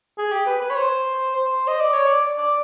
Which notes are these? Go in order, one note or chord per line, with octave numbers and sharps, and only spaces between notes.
G#4
G4
B4
B4
C#5
C5
C5
D#5
D5
C#5
D5
D5